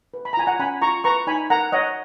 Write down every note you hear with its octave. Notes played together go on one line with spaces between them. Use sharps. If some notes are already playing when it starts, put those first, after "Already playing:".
B4
B5
A#5
F4 G#5
F#5 A#5
C#4 G#5 B5
F4 A#5 C#6
B4 A#5 C#6
D#4 G#5 B5
A#4 F#5 A#5
C#5 D#5 F#5